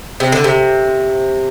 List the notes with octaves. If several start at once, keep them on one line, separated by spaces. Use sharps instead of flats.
C3
D3
C3